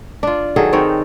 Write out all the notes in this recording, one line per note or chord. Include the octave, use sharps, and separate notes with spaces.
D4 F4
D#3 F#3 G#4 A4
D#3 C4 D#4 C#5